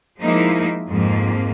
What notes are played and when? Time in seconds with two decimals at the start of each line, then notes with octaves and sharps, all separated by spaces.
0.19 F3 G#3 A#3 D#4 E4
0.88 F2 G#2 F3 A#3